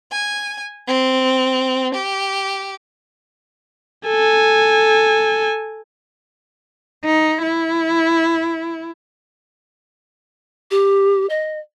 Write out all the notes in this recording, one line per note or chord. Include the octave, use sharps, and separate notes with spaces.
G#5
C4
G4
A4 G#5
D#4
E4
G4
D#5